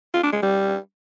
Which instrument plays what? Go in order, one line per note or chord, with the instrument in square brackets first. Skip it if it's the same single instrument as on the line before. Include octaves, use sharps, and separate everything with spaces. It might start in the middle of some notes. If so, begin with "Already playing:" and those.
[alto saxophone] F4
D4
G#3
G3